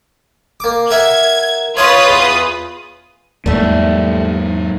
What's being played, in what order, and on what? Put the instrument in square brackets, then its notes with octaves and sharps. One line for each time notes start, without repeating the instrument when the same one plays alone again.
[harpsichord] A#3 D6
[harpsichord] A#4 E5 F#5 [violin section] G#6
[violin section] F4 B4 D#6 [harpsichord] C#5 F5 C6
[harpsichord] E2
[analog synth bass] E2 [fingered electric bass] G#2 A#3 [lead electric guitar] F#3 E5 [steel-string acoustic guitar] G3 A3